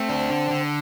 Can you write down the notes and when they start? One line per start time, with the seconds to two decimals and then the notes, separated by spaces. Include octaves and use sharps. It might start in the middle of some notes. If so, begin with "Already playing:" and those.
Already playing: A3 C4
0.09 D4
0.30 D3
0.50 D3